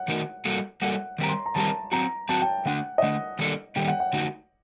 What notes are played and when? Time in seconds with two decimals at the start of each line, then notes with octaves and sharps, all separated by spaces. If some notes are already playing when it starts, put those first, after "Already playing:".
Already playing: F#5
0.08 D#3 A3 D#4 F#4 A#4
0.45 G3 A#3 F#4 A4
0.82 G3 A#3 F#4 A4 F#5
1.18 D#3 G3 C4 G4 A#4 A#5
1.28 C6
1.46 A#5
1.55 D#3 G3 C4 G4 A#4 A5
1.92 F#3 C4 F#4 A#5
2.29 F#3 C4 F#4 A5
2.42 G5
2.65 D3 A3 D4 F#5
2.98 D#5
3.02 D3 A3 D4 F#5
3.39 D#3 G3 A#3 D4 A4
3.76 D#3 G3 A#3 D4 A4 G5
3.88 F#5
4.00 F#5
4.13 D3 A3 D#4 F#4